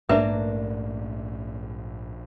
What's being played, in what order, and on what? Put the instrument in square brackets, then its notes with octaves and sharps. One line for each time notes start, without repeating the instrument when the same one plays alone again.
[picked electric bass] A#1 A3 [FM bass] G#2 [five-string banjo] A#3 D4 A#4 [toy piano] B4 E5